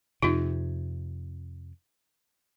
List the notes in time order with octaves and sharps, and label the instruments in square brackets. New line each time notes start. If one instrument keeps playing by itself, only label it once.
[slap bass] F2 C3 [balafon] D#4 F4